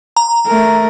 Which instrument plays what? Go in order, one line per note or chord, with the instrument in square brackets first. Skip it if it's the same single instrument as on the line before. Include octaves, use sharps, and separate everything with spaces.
[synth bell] A#5
[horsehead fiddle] A3 A#4